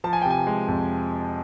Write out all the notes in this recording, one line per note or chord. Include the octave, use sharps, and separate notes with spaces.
F3 A5
G#5
C3 G5
G#5
G#3
F2